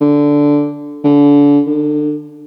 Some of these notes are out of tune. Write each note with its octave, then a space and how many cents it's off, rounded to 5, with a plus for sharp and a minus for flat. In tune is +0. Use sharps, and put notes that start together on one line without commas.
D3 -10
D3 -30
D3 +30